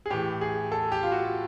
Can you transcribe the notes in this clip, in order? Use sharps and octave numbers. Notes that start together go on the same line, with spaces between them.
G#4
A2 E3 G4
G#4
A4
G4
F4
F#4